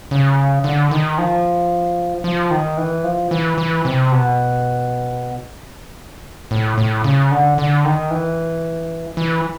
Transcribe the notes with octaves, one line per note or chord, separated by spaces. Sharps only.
C#3
D3
D#3
F3
F3
D#3
E3
F3
E3
E3
C3
B2
A2
A2
C#3
D3
D3
D#3
E3
E3